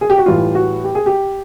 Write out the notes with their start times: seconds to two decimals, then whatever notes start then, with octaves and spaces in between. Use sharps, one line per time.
0.01 G#4
0.10 G4
0.18 F#4
0.26 A2 E3 G3 F4
0.55 F#4
0.84 G4
0.95 G#4
1.06 G4